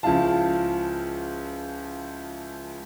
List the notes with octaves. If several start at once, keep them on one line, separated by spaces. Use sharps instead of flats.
C#2 F3 E4 F5 A5